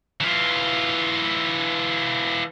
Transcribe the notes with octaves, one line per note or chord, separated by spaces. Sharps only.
E3 F4